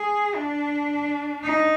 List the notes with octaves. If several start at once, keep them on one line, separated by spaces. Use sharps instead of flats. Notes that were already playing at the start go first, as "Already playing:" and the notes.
Already playing: G#4
D4
D#4